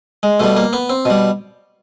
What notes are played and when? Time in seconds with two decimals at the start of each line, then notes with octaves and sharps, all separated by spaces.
0.23 G#3
0.40 B2 G3 A3
0.57 A#3
0.73 B3
0.89 C4
1.05 B2 G3